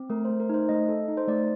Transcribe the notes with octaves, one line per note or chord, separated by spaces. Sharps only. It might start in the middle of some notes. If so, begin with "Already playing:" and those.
Already playing: C4
A3 A#4
C5
A3
A#4
D#4 C5
A3 D#5
A4
D#4
C5
A3 D5